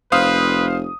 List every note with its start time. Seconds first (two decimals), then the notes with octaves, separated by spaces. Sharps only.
0.12 F1 B4 C5 F5 D#6